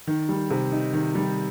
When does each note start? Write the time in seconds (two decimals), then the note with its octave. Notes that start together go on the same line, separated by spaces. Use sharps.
0.07 D#3
0.29 G3
0.50 C3
0.72 D#4
0.93 D#3
1.15 G3